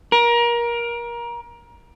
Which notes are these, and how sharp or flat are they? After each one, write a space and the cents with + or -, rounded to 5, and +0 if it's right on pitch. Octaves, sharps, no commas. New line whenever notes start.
A#4 +25